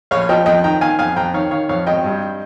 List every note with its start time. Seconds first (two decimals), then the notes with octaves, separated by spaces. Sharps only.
0.11 A#1 C#5 F5
0.29 F3 D#5 G5
0.46 F2 D#5 G5
0.64 D#3 G5 A#5
0.81 D#3 F5 G#5
0.99 F2 F5 G#5
1.16 F2 G5 A#5
1.34 D#3 C#5 F5
1.51 D#3 C#5 F5
1.69 F2 C#5 F5
1.86 G#1 D#5 G5
2.04 G2